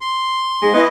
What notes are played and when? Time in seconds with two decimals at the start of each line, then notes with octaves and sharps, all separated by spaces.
0.01 C6
0.62 G#2 G#3
0.74 E3 B3 E4 D#5